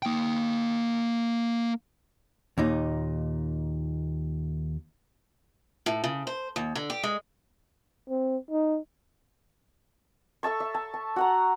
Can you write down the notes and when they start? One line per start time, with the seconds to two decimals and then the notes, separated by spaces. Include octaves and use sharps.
0.03 A#3 G5
2.58 D#2 A#2 D#4
5.86 A2
6.04 C#3
6.27 C5
6.56 D#2
6.75 D3
6.90 G4
7.03 G#3
8.10 C4
8.51 D#4
10.43 A4 E5 A5 C#6
10.60 E5
10.74 A5
10.94 A5
11.16 F#4 F#5 A#5